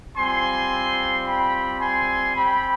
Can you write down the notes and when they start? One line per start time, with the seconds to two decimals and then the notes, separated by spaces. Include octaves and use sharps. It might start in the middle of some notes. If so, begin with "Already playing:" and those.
0.16 G3 C4 F4 G#5 C6
1.26 G5 B5
1.81 G#5 C6
2.36 C4 G4 G5 B5